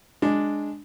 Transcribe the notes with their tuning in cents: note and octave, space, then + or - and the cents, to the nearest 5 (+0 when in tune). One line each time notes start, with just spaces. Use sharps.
G#3 +0 D4 +0